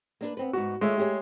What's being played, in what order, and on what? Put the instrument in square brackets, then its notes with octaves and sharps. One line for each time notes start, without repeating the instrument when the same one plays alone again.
[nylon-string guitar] A#3 D4 B4
B3 C4 B4
[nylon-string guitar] G#2 B3 [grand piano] F#4
[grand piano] G#3 E5 [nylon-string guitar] A3 F4 C#5
[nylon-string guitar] G4 G#4 C#5